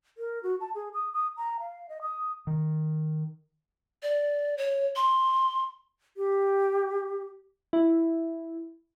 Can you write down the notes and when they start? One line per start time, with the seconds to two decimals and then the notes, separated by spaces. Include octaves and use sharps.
0.18 A#4
0.43 F#4
0.61 A5
0.75 G#4
0.94 D#6
1.13 D#6
1.37 A#5
1.60 F5
1.89 D#5
2.02 D#6
2.47 D#3
4.03 D5
4.58 C#5
4.96 C6
6.17 G4
7.73 E4